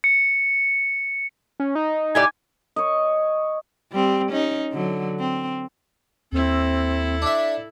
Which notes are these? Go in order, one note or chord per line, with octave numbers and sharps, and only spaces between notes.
C#7
C#4
D#4
A2 G4 D5 G#5
C#5 D#5
G3 C4
C#4 D#4
D3 F#3
C4
D#2 C4 E4 A4
D4 E5